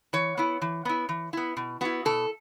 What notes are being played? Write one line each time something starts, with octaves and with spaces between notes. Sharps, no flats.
E3 C#5
B3 E4
E3
B3 E4
E3
B3 E4
B2
B3 E4 F#4
B2 A4